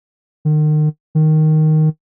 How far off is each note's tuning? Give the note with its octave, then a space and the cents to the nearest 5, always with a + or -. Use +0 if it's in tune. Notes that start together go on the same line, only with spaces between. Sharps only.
D#3 -35
D#3 +0